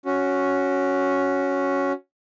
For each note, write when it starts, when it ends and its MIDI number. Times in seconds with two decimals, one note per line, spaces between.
0.05 1.93 61
0.05 1.93 66